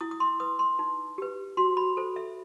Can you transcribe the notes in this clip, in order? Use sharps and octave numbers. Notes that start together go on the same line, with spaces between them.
E4 D#6
D#6
C6
B4 D#6
C6
D#4
G4 B4
F#4 C6
B5
A4 C5
E5